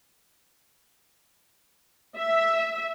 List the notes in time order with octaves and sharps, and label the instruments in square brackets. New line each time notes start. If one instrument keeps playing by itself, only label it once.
[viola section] E5